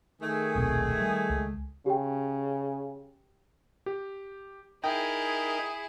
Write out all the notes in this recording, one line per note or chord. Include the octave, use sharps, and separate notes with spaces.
D#3 A3 G#4
D#1 B1 C4
G3
C#2 G#3
C#3 G4 G5
G4
D#4 E4 G#4 A#4 G5 D#6